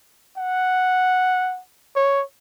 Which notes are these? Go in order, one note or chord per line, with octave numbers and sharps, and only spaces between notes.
F#5
C#5